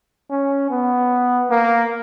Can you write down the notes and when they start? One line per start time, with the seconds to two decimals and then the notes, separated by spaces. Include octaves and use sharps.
0.31 C#4
0.71 B3
1.50 A#3